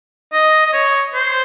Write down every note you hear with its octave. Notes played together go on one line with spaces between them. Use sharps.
D#5
D#5
C#5
C5